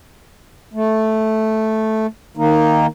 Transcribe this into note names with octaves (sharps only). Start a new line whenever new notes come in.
A3
D#3 A#3 D#4